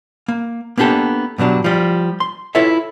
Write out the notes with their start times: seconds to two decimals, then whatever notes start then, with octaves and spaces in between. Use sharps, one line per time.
0.28 A#3
0.78 A#3 B3 D4 G4 A4
1.38 G2 B2 F#3 D4
1.64 F3 G3
2.20 C6
2.55 E4 F4 A4 B4 C#5 E5